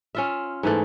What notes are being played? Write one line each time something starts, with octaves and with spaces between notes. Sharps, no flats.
C#4 F4 E5
G#2 E3 A3